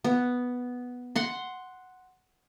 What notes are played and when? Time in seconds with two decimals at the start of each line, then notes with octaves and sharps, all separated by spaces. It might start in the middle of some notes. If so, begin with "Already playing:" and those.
0.04 B3
1.16 F#5 C6